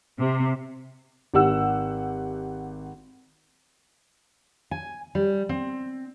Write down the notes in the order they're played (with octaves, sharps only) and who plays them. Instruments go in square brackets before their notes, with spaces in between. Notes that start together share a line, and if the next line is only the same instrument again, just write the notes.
[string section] C3
[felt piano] G#1 G4 F#5 E6
[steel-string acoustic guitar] G#5
G3
C4